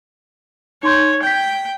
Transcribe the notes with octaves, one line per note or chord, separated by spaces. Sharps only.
D#4 C#5 C6 G6
G5 G6 B6